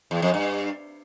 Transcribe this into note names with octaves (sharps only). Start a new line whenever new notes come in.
E2
F2
G2